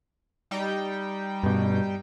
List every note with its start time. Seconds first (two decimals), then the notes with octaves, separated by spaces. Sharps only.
0.51 G3 D#4 G5
1.43 G2 B2